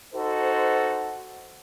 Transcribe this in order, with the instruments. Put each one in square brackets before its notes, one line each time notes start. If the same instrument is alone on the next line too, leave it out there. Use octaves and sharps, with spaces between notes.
[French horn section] D#4 F#4 A4 C5